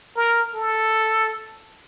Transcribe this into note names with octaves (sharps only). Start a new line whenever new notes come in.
A#4
A4